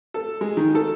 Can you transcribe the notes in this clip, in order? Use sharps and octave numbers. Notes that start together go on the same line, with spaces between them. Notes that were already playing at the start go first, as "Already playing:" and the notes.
A4
G#3
D#3
A4